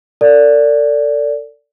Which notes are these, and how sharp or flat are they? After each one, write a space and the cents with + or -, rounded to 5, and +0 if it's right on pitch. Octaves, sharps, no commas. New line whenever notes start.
A4 +40 D5 -15